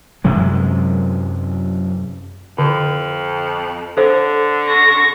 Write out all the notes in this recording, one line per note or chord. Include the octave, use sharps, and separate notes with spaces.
F#2 C3 F#3 G#3
F2 D3
D3 A4 C5
C#6 A#6